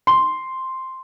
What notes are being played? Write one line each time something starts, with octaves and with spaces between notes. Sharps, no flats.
C6